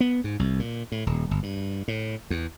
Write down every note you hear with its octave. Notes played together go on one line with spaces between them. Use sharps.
B3
G#2
C2
A#2
A2
D#1
G1
G2
A2
E2